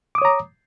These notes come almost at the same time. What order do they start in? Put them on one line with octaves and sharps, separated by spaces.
D6 D#6 C#5 A#5